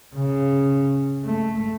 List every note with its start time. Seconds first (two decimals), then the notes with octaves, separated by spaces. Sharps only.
0.16 C#3
1.24 A3